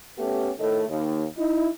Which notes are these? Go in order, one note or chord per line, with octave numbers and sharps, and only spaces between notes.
A3 B3 C#4 G4
A2 D#3 A3 A4 D#5
D#2
D#4 E4